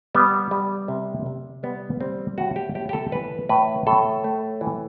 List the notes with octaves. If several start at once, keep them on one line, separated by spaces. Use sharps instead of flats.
G3 B3
G3
C3
C3
G3 B3
G3 C4
A2 F#4
G4
A2 G4
G4
A4
E3 B4
A2 B4
A2 A4
A3
E3